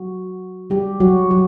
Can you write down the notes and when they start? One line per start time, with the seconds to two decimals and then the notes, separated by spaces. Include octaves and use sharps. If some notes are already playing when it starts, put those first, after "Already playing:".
Already playing: F#3 F#4
0.70 G3 G4
1.00 F#3 F#4
1.31 F#3 F#4